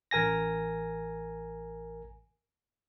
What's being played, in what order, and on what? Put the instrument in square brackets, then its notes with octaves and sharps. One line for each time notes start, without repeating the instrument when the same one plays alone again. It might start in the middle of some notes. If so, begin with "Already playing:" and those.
[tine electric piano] A1 A#4 G#5 A#6